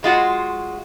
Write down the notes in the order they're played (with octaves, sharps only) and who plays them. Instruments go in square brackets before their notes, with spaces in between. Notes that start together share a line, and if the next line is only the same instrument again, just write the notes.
[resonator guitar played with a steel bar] F#3 G#3 F4 F#4